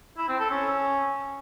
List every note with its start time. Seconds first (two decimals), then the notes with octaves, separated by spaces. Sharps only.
0.17 E4
0.28 C4
0.40 A4
0.51 C#4